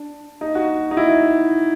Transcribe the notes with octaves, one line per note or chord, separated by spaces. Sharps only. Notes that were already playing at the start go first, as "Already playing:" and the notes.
Already playing: D4
D#4
F#4
D#4
E4